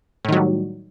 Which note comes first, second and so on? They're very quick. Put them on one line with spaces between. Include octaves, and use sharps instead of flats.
A2 D#3 F#3 G3